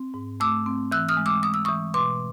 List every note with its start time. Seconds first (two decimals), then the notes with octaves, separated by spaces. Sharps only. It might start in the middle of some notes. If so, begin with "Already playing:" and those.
Already playing: C4
0.14 G#2
0.40 A3 D6 E6
0.66 C4
0.92 E3 E6 F#6
1.09 D#6 F6
1.17 G#3
1.26 D6 E6
1.43 G#3 D#6
1.54 E6
1.65 E3 C#6 D#6
1.94 B2 C6 D6